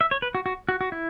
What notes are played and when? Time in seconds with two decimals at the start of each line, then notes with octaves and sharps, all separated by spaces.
0.01 E5
0.11 C#5
0.22 B4
0.35 F#4
0.46 F#4
0.69 F#4
0.81 F#4
0.92 E4